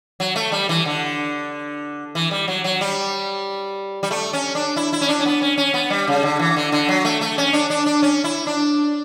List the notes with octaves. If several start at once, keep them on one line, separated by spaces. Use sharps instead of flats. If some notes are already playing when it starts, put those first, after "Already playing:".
F#3
A3
G3
E3
D3
E3
G3
F#3
F#3
G3
G3
A3
C#4
D4
E4
E4
C#4
D4
C#4
B3
C#4
C#4
B3
G3
C#3
D3
E3
D3
D3
F#3
A3
A3
C#4
D4
D4
D4
C#4
E4
D4